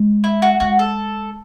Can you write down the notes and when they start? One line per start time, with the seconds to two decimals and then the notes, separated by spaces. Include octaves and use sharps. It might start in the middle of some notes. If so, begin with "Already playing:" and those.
Already playing: G#3
0.24 E4
0.42 F#4
0.60 G#3 F#4
0.79 A4